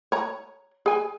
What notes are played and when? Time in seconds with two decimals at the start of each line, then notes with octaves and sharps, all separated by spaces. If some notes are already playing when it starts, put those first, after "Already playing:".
0.12 C#5 A#5
0.86 G#4 G#5